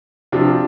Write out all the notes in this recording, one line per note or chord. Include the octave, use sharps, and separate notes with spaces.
C3 F3 D4 F4